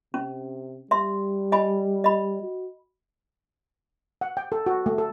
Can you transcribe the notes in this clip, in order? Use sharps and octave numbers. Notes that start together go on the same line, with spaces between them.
C3 C#4
G3 E5 C6
D#5 G#5 B5
D#5 B5
F#4
F#5
G5
A4
F#4
A3
A4